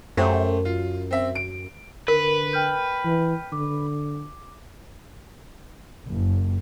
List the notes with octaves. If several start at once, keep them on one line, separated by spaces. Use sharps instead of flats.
F#2 A3 G4 C5
F4
C4 E5
D7
D3 A#4 B4
G5 F6 G6
E3
D3 D6
F#1